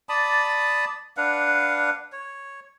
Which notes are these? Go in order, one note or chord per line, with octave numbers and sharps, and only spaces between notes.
D5 A5 B5 D#6
D4 B4 F5 F#5
C#5